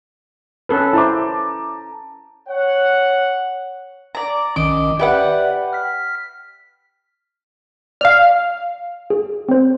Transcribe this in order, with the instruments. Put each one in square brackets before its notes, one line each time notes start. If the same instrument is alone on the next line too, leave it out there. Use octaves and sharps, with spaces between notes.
[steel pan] C#4 A4 B4
[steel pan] E4 C5 [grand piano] A5 A#5 D6
[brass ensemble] C#5 F#5
[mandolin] D5 A#5
[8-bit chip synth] B1 D#3 C#4 [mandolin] D#5 D6
[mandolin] G4 B4 F#5 [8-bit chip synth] D5 E5
[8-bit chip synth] F6 B6
[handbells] D5 [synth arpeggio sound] F5 F6
[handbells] G#4
C4 C5